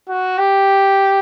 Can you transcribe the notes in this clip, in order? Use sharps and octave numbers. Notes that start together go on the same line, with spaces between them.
F#4
G4